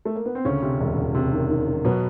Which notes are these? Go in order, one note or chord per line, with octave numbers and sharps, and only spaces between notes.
A3
A#3
B3
C4
D2 C#3 C#4
C3
E1
E1
C3
D#3
D#3
D#3
B2 F#3 B3